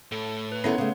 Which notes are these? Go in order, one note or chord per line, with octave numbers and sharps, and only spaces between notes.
A2 A4
B4
D#3 B3 C#4 E4 A4 C#5 F#5 C6
C#3 A3